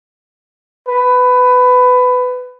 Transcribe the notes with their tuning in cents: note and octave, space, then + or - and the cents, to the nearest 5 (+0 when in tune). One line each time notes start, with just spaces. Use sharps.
B4 +20